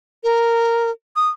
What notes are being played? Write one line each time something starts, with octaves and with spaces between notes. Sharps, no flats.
A#4
D#6